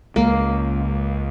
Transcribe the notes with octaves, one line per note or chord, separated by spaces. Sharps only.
C#2 G#3 A#3